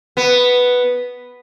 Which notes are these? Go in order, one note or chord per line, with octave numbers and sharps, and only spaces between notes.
B3